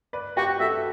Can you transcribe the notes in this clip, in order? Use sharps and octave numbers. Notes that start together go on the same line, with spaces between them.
B4 D5
F#4 G4 B4
F#4 A4 E5